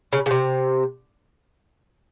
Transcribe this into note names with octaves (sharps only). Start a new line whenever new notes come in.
C#3
C#3
C3